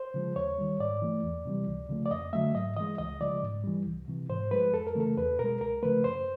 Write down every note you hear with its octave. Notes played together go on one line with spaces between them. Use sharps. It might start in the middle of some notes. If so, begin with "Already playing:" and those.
Already playing: C5
C#3 F3 G#3
D#2 C#5
D#3 G3
G#2 D5
E3 A3
E2
C3 E3 G3
C#2
C#3 F3 A3
D5
F2 D#5
D3 F#3 A3 E5
G#2 D#5
E3 G#3 D#5
C#2 D#5
C#3 F3 G#3 D5
G#2
E3 G3
C2
C3 E3
G#2 C5
F3 G#3 B4
F2 A4
A#4
C#3 E3 A3 A4
E2 B4
B2 G#3 A#4
C#2 A#4
C#3 F3 A3 B4
F#2 C5